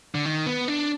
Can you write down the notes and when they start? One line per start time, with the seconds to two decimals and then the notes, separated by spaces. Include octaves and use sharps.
0.15 D3
0.26 D#3
0.46 B3
0.68 D4